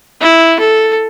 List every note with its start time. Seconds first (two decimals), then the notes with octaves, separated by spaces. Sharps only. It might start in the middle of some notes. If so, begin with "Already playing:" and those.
0.21 E4
0.59 A4